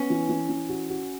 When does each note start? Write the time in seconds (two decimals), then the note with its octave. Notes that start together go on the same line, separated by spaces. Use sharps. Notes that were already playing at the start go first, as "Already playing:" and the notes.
Already playing: B3 C#4
0.10 E3
0.29 E3
0.49 E3
0.69 F#4
0.90 F#4